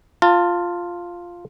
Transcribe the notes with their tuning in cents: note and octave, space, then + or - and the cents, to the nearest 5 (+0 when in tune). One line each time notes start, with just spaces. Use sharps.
F4 +0 A5 +25